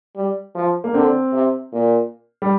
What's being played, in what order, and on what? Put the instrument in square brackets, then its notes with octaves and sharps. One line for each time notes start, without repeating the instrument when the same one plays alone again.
[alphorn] G3
F3
[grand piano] A#3
[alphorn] D3 [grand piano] C4
[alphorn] C3
A#2
[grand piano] G3